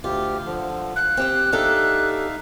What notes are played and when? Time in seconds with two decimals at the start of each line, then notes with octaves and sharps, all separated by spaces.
0.04 D2 F4 G4
0.46 D3 F3
0.96 F5 F#6
1.17 C4 G4 C5
1.52 D4 D#4 G4 A4 E5 F5